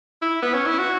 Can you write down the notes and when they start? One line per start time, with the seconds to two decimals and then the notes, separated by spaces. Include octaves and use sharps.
0.22 E4
0.42 B3
0.54 C#4
0.66 E4
0.79 F#4